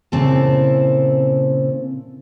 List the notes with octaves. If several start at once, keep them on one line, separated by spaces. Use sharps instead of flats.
A#2 C#3 C4 E4 A4 A5